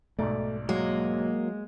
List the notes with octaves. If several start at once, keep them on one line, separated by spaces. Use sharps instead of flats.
B1 G#2 A3 D5
F#3 G#3 A#3